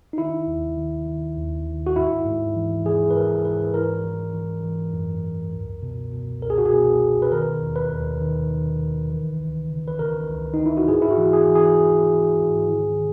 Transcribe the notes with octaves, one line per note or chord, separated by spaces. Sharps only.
D#4
D#3 E4
D#2
D#3
D#3
D#2
D#3
F#4
G#2 E4
G#2
E3
E3 G#4
B4
G#2 A#4
G#2 B4
E3 A#4
E3
E3
E3
F#2
F#2
C#2
B2
B2
C#2 A#4
G#4
F#4
G#4
B2
B2
B4
D#3 A#4
D#2
B4
D#2
D#3
D#3
D#3
E3
C#2
C#3
B4
C#3 A#4
C#2
C#3 D#4
E4
F#4
G#2 G#4
E4
F#4
E3
G#4
E3
G#4
E3
E3
G#2
D#3
D#3